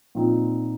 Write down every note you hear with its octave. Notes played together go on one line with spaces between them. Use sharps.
A#2 F3 C4 D#4